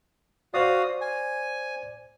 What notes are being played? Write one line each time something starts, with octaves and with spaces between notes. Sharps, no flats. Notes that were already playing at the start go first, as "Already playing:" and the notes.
F#4 C5 D5 F5 D#6
G#5